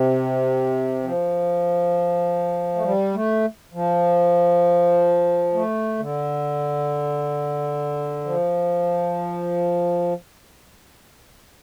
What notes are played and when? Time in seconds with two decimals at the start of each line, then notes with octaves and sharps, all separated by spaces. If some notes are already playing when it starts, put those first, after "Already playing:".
Already playing: C3
1.03 F3
2.76 A3
2.84 G3
3.14 A3
3.73 F3
5.54 A3
5.99 D3
8.25 F3